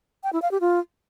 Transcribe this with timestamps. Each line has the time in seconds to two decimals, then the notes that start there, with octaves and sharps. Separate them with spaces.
0.24 G5
0.33 E4
0.42 F5
0.51 G4
0.61 F4